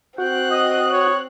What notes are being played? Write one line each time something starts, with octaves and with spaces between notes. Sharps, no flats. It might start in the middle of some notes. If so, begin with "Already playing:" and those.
C4 F#4 G5 F#6
D#5 D#6
C#5